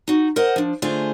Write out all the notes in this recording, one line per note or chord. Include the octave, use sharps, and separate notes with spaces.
D#4 F#4
A#4 C5 D#5 F#5
F3 D4
D3 A3 F4 G#4 C5 G#5